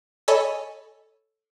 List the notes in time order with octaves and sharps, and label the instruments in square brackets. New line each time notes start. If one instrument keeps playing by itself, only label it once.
[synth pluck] A4 C#5 D#5 G#5 B5